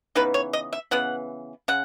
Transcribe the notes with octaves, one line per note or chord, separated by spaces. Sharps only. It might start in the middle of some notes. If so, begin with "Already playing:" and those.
C#3 E3 B3 D#4 B4
C#5
D#5
E5
C#3 E3 B3 F#5
C#3 F#5